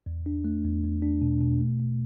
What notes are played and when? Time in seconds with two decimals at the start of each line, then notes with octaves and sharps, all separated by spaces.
0.06 E2
0.26 D4
0.44 A3
0.64 E2
0.84 E2
1.02 D4
1.22 B2
1.41 B2
1.60 A3
1.80 A3